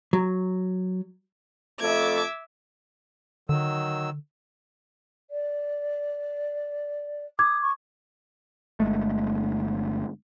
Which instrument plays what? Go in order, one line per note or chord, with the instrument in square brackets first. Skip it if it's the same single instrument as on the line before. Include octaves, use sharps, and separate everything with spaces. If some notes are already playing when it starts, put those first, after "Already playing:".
[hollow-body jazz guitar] F#3
[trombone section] F2 A3 A4 [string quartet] E5 D6 G#6
[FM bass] D3 [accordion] D#3 F#3 E6
[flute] D5
[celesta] D6 G#6 [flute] D#6
[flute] C#6
[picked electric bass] G1 G#3 A3